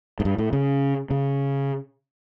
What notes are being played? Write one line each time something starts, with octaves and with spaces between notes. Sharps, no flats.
G#2
G2
A2
C#3
C#3